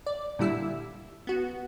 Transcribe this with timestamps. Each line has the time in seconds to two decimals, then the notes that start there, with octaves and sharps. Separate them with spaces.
0.06 D5
0.39 A#2 D3 G3 E4 E6
1.27 B3 F#4